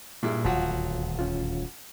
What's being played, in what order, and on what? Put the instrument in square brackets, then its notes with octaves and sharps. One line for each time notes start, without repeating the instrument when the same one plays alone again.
[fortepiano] G2 G#3 E4 [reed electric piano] A#2
[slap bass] D#1 D2 [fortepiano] F3 F#3 F#5 [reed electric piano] F4
[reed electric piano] C#4 F4